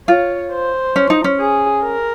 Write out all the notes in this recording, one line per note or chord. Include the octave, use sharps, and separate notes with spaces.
F4 C#5
C5
C#4
D#4
C#4
G#4
A#4